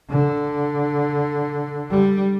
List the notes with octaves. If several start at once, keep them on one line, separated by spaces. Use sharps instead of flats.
D3
G3